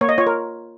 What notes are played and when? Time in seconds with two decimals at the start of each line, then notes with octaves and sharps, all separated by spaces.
0.01 A#3 C#5
0.09 D#5
0.18 F4 C#5
0.27 A#4